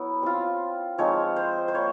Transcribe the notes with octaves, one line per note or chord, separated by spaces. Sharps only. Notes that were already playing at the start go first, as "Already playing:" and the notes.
Already playing: F#3 B3 E4
G3 C4 F4
F3 G#3 C4 D#4 C#5
C5
C5
A#3 C#5